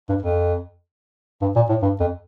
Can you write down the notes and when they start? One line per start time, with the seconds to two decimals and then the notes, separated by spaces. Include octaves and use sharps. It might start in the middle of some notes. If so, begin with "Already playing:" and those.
0.09 G2
0.23 F2
1.42 G2
1.56 A#2
1.69 A2
1.82 G2
2.00 F2